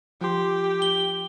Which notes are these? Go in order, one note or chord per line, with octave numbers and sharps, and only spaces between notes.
F3 G4 C6
G7